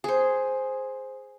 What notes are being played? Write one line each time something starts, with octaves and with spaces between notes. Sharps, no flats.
G#4 C5